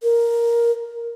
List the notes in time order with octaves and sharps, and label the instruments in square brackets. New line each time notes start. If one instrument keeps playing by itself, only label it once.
[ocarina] A#4